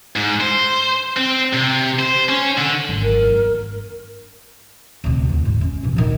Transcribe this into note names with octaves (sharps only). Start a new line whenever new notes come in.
G#2
C5
C4
C3
C5
C#4
D3
G#1 F#2
A#4
G1
D2 C3
E2
G#2
C#4
C3 E3
D3 D#3